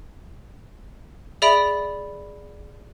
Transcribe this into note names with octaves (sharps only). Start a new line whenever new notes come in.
G#4 D5 E5 B5 D7 F7